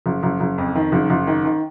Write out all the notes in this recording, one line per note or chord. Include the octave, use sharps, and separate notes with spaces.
F#1
F#1
F#1
F2
D#3
F#1
F#1
D#3
D#3